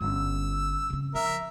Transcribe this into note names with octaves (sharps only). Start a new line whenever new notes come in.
G1 C#4 E6
C#3 C4
F3 A#4 E5